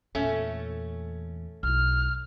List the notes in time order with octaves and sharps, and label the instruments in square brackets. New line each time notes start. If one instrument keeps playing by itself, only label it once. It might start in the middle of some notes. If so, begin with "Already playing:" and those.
[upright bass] E2 A#2 [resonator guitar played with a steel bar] A3 C#4
[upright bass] B1 E4 [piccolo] F6